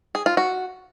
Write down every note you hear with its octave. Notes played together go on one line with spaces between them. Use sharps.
G#4
F4
F#4